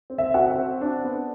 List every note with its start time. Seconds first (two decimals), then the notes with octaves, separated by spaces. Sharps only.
0.10 C4
0.18 E5
0.34 F#4 F#5
0.58 C4
0.81 D4
1.04 B3